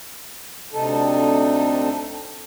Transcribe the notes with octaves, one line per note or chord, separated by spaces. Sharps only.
D2 C3 D#4 A4